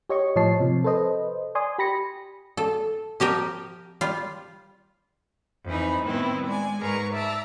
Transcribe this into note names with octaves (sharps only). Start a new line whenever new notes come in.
G4 C#5 D#5 C#6
A2 F3 C#5 D#5 A5 C7
C3 F3
A4 B4 C5 D#5
D5 G#5 C6 D#6
G4 B5 A#6 C#7
A4
F3 G4 A#4 G5
G3 F4
F2 E3 D#4 G#5 B5
A2 D#3 G3 B3 C4 E4
G#3 D5 G#5
G#2 G#4 A#4 B4 A#5 C#6
D5 E5 A5 A#5 E6